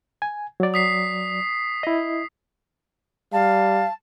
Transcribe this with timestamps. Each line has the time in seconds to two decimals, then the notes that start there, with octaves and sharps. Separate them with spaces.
0.22 G#5
0.60 F#3 D5
0.74 D#6 B6 C7
1.83 E4 D#5
3.33 G3 F5 A5